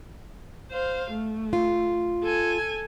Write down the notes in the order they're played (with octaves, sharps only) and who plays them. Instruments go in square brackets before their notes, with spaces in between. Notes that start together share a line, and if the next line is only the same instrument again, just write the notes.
[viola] C5 F5
A3
[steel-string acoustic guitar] F4
[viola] A4 G#5